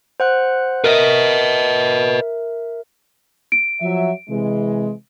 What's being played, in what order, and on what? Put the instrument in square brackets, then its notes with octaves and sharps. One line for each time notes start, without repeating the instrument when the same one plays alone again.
[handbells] C5 F#5 F#6
[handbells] A#4 E5 [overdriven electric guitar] B4 D#5
[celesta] D7
[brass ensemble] F3 F#3 E5
C3 E3 G#3